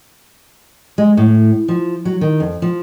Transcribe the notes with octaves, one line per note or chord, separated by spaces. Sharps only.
G#3
A2
F3
F#3
D#3
F2
F3